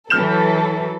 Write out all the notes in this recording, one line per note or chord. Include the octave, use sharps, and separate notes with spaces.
E3 F#3 A4 F6 G6 E7